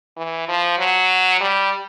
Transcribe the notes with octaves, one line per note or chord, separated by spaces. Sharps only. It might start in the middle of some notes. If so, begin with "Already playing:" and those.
E3
F3
F#3
G3